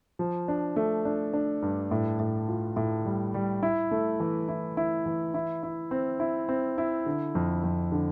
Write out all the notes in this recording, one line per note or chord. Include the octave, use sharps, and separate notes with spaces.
F3
D4
A3
D4
D4
G2
A2
A2
F4
A2
G3
G3
E4
A3
E3
E4
E4
E3
E4
E4
C4
E4
C4
E4
D3
F2
F2
D3